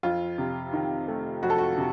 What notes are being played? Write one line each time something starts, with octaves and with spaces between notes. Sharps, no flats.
F2 F4
C3
D#3
A3
F2 F#4
A4
F#4
C3